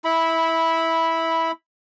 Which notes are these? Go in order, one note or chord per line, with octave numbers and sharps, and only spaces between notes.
E4 B5